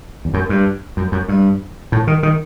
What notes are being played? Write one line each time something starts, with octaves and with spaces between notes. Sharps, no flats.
E2
F#2
G2
F#2
F#2
G2
A2
D#3
D#3